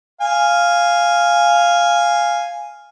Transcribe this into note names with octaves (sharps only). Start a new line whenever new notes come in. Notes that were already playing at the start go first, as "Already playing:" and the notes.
F5 G#5